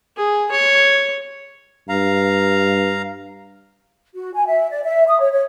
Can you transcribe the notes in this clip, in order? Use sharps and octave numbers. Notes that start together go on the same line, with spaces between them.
G#4
C#5
G2 F5 A#5
F#4
G#5
E5
D5
E5
D#6
C#5
C#5